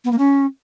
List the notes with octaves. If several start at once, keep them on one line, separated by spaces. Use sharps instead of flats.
B3
A#3
C#4